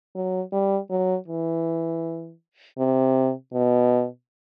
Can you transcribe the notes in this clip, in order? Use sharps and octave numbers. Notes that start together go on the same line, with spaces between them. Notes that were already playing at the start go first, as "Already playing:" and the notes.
F#3
G3
F#3
E3
C3
B2